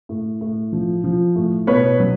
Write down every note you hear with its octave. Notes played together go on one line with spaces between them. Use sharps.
A2
A2
F3
F3
A2
B2 B4 C#5
F#3